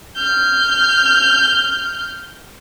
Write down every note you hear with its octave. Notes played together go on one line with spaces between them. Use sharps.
F6 G6